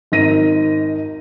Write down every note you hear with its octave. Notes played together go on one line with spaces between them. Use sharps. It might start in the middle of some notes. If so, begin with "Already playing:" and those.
G#1 D#4 A#4 A#6 D#7